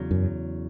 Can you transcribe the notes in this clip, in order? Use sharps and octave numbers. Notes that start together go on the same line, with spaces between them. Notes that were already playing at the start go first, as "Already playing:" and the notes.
Already playing: E2 C#3 F#3
F#2